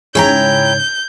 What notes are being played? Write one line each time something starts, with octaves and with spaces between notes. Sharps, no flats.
G#2 C#3 C#4 E4 C#5 G5 A#5 G6